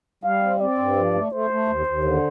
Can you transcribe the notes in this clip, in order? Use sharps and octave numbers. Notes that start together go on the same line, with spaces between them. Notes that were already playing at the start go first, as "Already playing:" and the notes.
G3 F5
C4
C4 D5
G2
F3
A3
A3 C5
A3
D#2
D#2
D3